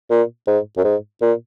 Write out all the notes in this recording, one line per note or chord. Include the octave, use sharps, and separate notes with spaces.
A#2
G#2
F#2
G#2
A#2